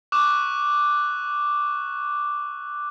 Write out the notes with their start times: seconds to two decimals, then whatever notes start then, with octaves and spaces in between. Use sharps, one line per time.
0.12 C#6 D6 E6 F#6 E7